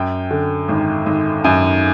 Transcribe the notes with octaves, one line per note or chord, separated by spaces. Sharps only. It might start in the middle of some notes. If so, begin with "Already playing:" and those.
Already playing: F#2 G5
D3
G#1
G#1
F#2 G#5